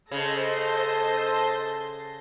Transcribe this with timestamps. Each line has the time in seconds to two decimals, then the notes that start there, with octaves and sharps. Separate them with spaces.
0.11 C#3 A4 C5 D#5 A5 C6 G6 A#6